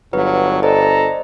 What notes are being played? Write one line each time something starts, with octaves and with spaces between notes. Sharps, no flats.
G1 F#3 B4 F5
A4 C5 D5 D#5 A#5